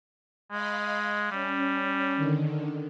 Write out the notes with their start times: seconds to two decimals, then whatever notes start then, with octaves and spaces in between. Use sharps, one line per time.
0.51 G#3 D#5 F5 B5
1.32 G3 C#4
2.16 D3 D#3